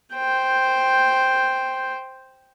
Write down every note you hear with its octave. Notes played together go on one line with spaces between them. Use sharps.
C5 G5